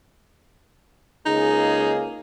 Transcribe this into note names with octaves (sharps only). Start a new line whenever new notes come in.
C#2 A#3 D#4 G#4